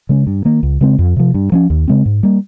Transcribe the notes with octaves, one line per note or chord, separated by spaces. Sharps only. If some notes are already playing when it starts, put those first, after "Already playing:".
C#3 G#3 C#4
G2
D#3 A#3
C#2
C#3 G#3 C4
F2
C3 F3
G2
F3 A#3 C#4
D#2
C#3 G#3 C4
G#2
G3 A#3